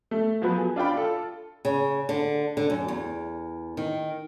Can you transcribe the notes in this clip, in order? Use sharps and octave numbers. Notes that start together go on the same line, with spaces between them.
A3
F3 F#3 B3
G#4
D4 F4 D5 G5 B5
F4 A4
C#3
D3
D3
F#2
E2
D#3